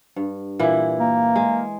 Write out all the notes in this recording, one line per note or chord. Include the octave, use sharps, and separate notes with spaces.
G2
A#2 E3 E4
A#3
G#3